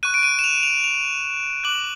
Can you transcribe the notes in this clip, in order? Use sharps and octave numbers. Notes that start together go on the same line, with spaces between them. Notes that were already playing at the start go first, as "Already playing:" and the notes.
C#6 F#6 D#7
D7
D#7
E7
F7
F7
F7
D6 F#6 F#7